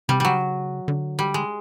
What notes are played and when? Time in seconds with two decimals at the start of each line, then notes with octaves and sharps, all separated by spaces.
0.09 C3 G3
0.20 C#3 F#3 G3
0.88 D3
1.19 G3
1.34 G#3